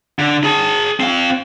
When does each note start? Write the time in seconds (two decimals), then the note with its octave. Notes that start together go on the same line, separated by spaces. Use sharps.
0.19 D3
0.44 G#4 A5
1.00 C4 F5